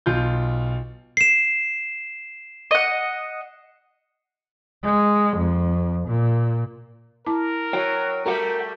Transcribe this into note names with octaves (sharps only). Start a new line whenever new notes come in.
B1 F4 G6
C7 E7
D#5 F#5
G#3
F2
A#2
E4 A#4 A5 D6
F#3 F#4 C#5 G5
G3 A3 F#4 G4 A#4 F#5